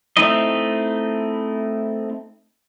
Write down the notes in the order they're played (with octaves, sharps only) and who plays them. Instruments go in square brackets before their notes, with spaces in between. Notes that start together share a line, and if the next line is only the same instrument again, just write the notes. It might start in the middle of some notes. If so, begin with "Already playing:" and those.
[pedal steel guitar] A3 C4 D#4 E4 D#5